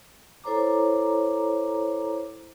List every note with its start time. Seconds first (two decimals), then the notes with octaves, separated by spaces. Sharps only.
0.44 E4 A4 C5 C#5 A#5 D6